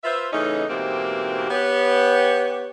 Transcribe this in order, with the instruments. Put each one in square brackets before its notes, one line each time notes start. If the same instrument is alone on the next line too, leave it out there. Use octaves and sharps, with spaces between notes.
[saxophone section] F4 B4 C5 E5
C#3 E3 A3 C#4 D#4
G#2 B2 E3 A#3 C4 G4
B3 G4 C#5